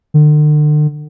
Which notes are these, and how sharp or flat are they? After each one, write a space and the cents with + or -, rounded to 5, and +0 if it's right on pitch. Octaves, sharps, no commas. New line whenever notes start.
D3 +40